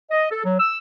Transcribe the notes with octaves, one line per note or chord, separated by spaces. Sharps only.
D#5
A4
F#3
E6